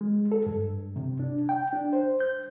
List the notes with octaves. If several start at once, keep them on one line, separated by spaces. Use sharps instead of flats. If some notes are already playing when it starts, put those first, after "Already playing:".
G#3
A4
G2
C3
D4
G5
D4
C5
G6